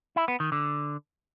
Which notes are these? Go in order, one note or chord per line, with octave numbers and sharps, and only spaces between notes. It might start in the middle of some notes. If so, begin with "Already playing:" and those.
E4
B3
D#3
D3